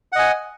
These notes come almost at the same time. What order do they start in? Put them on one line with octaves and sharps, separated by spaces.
F#5 D#5 G#5